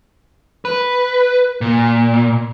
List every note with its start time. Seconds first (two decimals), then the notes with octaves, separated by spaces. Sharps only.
0.65 B4
1.61 A#2